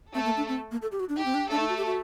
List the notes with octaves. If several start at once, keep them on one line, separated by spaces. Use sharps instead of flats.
A3 C4 A4
A#3
D4
C4
A#3
A4
G4
F#4
D4
D#4 G4
C4
D4
A3 D4 A4
D#4
F#4
G4
F#4